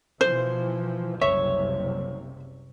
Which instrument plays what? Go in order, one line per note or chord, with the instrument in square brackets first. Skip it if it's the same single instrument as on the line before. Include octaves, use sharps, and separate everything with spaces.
[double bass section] B2 E3 F3 [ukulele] C5
[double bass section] F#1 C2 C3 [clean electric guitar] C#5 [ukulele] E5